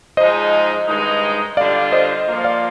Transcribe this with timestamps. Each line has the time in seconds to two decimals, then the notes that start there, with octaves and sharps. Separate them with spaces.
0.17 G#2 F3 G#3 D#4 C5 D#5
0.87 G2 D#3 G#3 D#4
1.57 D3 G3 D4 F4 D5 F5
1.92 C5 D#5
2.27 F3 A#3 F4
2.44 D5 F5